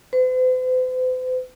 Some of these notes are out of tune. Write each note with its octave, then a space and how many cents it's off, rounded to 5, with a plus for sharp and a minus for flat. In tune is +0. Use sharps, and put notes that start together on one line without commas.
C5 -45